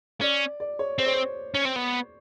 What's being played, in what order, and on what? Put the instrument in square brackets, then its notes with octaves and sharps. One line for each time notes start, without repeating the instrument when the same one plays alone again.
[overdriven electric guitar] C#4 [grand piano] D5
[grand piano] D5
C#5
[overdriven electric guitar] C4 [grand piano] C5
[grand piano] C#5
C5
[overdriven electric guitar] C#4
C4
B3